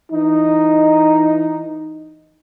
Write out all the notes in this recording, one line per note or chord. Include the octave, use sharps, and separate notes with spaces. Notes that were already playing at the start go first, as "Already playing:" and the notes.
E3 D#4